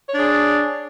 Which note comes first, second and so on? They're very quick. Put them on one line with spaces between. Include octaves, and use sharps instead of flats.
C#5 D4 G#4